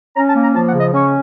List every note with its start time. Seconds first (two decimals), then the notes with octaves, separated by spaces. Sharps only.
0.16 C#4 A#5
0.29 A5
0.35 A#3
0.43 A#5
0.55 F3 A5
0.68 F#5
0.74 C#3
0.80 D#5
0.94 C#4 C#5